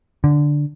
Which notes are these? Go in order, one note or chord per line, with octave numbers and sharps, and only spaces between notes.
D3